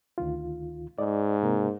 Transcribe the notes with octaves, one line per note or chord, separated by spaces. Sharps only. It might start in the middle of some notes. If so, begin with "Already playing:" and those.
D2 D#3 F4
G#2 D5 D#5
C3 A#3 A#4